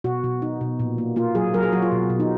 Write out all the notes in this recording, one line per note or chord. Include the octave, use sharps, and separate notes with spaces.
B2 F#4
B2
D#4
B2
A#2
A#3
A#3 F4
F#3 G#4
F#3 A#4
G#4
F#3 F#4
F4
B2
B2
D#4